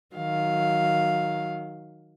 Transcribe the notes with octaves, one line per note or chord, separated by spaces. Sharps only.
D#3 F#3 F5